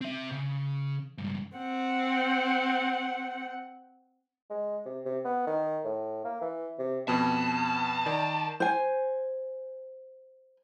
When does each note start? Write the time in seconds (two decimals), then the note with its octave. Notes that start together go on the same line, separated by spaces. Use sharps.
0.01 C4 E5
0.31 C#3
1.18 C#2 G2
1.56 C4 F#5
4.50 G#3
4.85 C3
5.06 C3
5.25 B3
5.47 D#3
5.85 A2
6.25 A#3
6.41 E3
6.79 C3
7.08 F2 B2 B3 A5
8.06 D#3 D5
8.60 C5 G#5